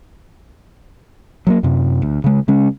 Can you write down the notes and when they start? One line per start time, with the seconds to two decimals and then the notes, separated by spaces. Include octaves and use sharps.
1.47 F#3 G#3 A#3
1.63 F#2 C3
2.02 D2
2.24 C#3 G#3
2.48 C#3 G#3 C#4